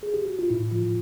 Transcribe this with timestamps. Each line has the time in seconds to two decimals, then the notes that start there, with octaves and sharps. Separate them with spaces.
0.03 G#4
0.14 G4
0.25 F#4
0.39 F4
0.50 A2 E4
0.71 F3 F4